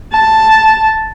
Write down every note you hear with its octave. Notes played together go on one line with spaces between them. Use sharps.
A5